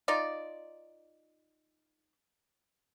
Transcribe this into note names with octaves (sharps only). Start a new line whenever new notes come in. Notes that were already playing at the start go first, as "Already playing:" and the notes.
D#4 F4 D5